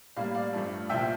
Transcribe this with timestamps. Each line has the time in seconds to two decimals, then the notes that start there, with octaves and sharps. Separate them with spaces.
0.16 A2 G3 A#3 D5 F5
0.35 D5 F5
0.53 G2 F3 A3
0.89 C2 A#2 F3 E5 G5